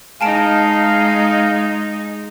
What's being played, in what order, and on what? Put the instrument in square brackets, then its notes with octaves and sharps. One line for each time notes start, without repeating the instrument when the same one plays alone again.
[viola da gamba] G#3 D#4 [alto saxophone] F5 [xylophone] G#5 A5 D7